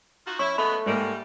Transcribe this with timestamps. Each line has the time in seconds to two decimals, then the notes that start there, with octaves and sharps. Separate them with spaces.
0.27 D#4 F4 F#4
0.39 C#4 E4 C#6
0.58 F#2 G#3 A3 B3 B5
0.86 G#2 G3 A#3